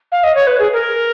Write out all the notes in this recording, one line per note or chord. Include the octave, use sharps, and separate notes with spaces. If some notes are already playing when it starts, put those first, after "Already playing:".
F5
D#5
C#5
B4
G#4
A#4